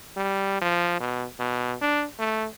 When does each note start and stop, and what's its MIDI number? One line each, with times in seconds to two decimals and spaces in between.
0.17 0.60 55
0.61 0.96 53
1.01 1.26 47
1.39 1.76 47
1.81 2.05 62
2.19 2.47 57